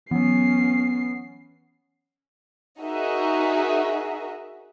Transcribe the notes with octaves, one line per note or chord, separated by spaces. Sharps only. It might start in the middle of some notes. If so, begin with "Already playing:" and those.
E3 F#3 B3 C#4 C7
D#4 F#4 G#4 A#4 D#5 E5